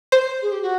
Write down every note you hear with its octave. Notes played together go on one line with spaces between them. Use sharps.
C5
G#4
G4
F#4